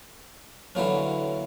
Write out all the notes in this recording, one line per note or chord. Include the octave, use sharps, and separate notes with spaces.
D3 E3 F#3 A#3 C#4